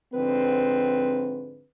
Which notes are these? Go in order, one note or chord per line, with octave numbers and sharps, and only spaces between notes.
G#2 D3 F3 C4 B4